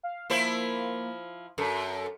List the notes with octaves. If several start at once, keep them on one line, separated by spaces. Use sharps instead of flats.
F5
F3 A#3 E4 C5
F#2 A4